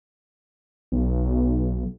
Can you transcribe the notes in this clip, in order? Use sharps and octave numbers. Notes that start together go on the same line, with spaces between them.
B1